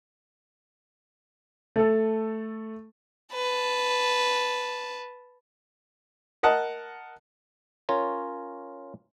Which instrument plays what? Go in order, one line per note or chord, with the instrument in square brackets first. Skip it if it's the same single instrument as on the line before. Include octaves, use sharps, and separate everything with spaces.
[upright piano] A3 A4
[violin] B4 A5
[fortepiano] A#4 D#5 F#5 A5
[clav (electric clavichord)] C#4 F4 A#4 C#5